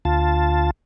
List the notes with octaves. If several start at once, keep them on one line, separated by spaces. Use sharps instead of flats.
D2 F4 A5